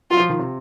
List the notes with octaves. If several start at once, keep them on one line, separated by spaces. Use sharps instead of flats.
F#3 F4
F3
D#3
C3